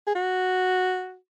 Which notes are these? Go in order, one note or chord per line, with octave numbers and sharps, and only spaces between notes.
G#4
F#4